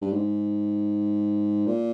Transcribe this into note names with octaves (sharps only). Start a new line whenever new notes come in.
G2
G#2
A#2